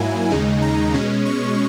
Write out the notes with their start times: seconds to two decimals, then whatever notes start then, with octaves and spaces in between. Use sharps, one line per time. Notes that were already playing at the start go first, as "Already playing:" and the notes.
Already playing: G#2 F#3 A#3 E4 G#5
0.31 D#2 C#3 G#3 D#4
0.62 A#5
0.93 B2 G#3 C#4
1.25 C#6